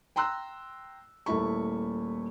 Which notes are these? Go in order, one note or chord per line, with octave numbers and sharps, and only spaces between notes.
G5 A#5 C6 E6 F#6
D#1 A3 A#3 E4 B5 C#6